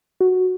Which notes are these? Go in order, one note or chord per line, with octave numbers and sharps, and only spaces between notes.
F#4